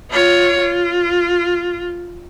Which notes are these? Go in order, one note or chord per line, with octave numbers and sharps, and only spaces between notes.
F4 C#5
F4